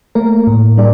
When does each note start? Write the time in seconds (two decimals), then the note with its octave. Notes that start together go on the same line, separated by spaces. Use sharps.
0.15 A3 A#3 A#4
0.47 A2
0.77 G3 D4 D5